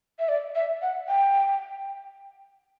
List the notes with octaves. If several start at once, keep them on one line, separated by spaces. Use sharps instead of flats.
E5
D5
E5
F#5
G5